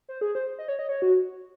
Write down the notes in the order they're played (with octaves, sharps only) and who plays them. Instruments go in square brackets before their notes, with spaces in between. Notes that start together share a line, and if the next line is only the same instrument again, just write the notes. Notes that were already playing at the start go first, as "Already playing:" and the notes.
[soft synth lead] C5
G#4
C5
D#5
C#5
D#5
C#5
F#4